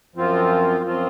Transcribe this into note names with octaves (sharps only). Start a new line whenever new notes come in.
F#2 F3 C4 F4
F#2 F3 C4 F4